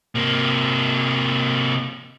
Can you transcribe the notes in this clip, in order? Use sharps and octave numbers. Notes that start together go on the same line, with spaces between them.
C3 A#3